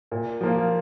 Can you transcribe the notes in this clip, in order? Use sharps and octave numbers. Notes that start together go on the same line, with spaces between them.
A#2
F3 A#3 F4